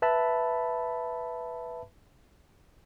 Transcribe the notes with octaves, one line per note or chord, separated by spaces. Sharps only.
B4 E5 A5 B5